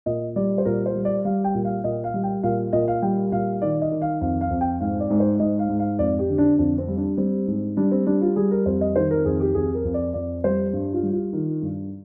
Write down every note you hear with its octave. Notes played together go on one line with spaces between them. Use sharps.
A#2 D#5
G3 D5
C5
A#2 A#4
C5
G3
D5
G3 F5
G5
A#2
F5
A#2 D#5
F5
G3
G5
A#2 F5
A#2 D#5
F5
G3 G5
A#2 F5
D#3 D5
D#5
D#3
F5
F2 F5
F5
F2
G5
G#2 F5
D5
G#2
C5
G#2 D#5
F5
G#2
F5
F2 D5
G4
D3
D4
F2 D4
C4
G3
D4
G3 C4
G#2
G3 D4
C4
G3 D4
F4
G3 G#4
A#4
F2 C5
D#5
D#3 C5
A#4
F2 G#4
G4
F2 G#4
A#4
F2
D5
F2 D5
G3 C5
G2
F4
G3
F4
D#3
G2